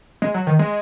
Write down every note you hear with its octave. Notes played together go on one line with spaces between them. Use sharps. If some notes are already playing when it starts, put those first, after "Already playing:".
G#3
F#3
D#3
G#3